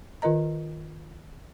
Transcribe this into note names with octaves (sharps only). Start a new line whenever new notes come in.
D#3 F4 A#4 D#5 A#5